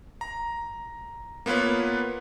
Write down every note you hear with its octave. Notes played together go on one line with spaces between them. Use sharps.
A#5
A#3 B3 F4 B4 C#5